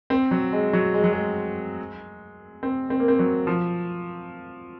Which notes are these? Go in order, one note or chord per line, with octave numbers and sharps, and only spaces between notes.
C4
F#3
G#3
F#3
G#3
F#3
G#3
C4
C4
A#3
C4
F#3
F3